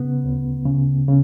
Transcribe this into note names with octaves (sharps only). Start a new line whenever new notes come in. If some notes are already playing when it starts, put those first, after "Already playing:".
Already playing: C#3 B3
D2
C#3
C#3